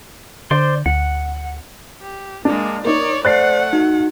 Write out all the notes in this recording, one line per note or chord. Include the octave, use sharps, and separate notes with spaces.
D3 C5 D5 C6
D2 F#5
G4
G#3 A#3 D4
A#3 D#4 C#5 D5
A3 C5 D5 F#5 F#6 A6 C7
D#4 F#4